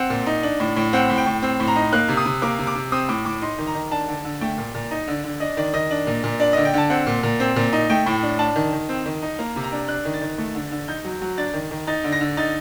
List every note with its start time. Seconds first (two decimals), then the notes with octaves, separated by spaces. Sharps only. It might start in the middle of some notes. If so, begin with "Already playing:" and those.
Already playing: C4 F#5
0.10 A#2
0.27 D#4
0.43 D4
0.60 A2
0.76 A2
0.93 C4 F#5
1.09 A2
1.18 G5
1.26 A2
1.42 C4
1.60 A2
1.68 A#5
1.76 D#4
1.93 A#3 F#6
2.09 C3
2.17 D#6
2.26 C3
2.42 A#3 D6
2.59 C3
2.67 D6
2.75 C3
2.92 C4 D#6
3.09 A2 D6
3.25 A2 D6
3.42 D#4 C6
3.58 D#3
3.67 A#5
3.75 D#3
3.91 D4 A5
4.08 D3
4.24 D3
4.41 A3 G5
4.58 A#2
4.75 A#2
4.91 D#4
5.08 D3
5.24 D3
5.40 D4 D#5
5.57 D#3 D5
5.74 D#3 D#5
5.91 D4
6.07 A#2
6.24 A#2
6.40 D4 D5
6.53 D3 D#5
6.65 G5
6.74 D3 A5
6.90 C4 F#5
7.07 A#2
7.23 A#2
7.40 C4
7.56 A#2
7.73 D#4
7.90 A3 G5
8.06 A2
8.23 D4
8.39 D4 A5
8.56 D#3
8.73 D#3
8.89 C4
9.06 D#3
9.22 D#4
9.39 A#3 A#5
9.56 C3
9.63 A#5
9.72 D4
9.88 D4 F#6
10.05 D#3
10.14 A6
10.21 D#3
10.38 A3
10.55 D3
10.72 D3
10.88 D#4 G6
11.05 F#3
11.22 F#3
11.38 D4 A6
11.54 D#3
11.71 D#3
11.87 D#4 A6
12.04 D3
12.12 A#6
12.21 D3
12.37 D#4 A6